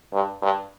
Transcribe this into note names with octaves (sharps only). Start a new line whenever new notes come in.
G2
G2